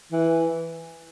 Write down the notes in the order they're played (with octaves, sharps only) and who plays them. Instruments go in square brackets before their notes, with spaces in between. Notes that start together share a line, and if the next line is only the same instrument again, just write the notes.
[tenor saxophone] E3